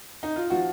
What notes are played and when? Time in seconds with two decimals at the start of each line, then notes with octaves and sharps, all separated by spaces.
0.23 D#4
0.36 F4
0.50 F3 F#4